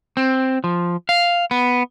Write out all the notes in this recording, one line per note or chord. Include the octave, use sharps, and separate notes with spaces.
C4
F3
F5
B3